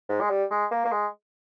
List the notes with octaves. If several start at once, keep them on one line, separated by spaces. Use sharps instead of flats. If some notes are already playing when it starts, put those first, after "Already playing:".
G#2
G#3
G3
G#3
A#3
A#3
G#3